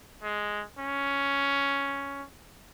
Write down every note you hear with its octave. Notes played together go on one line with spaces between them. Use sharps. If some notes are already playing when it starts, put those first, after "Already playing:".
G#3
C#4